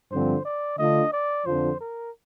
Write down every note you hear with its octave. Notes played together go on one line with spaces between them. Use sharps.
G2 D3 F3 C4 C5
D5
D3 A3 D4 F4 D#5
D5
F2 D3 F3 C5
A#4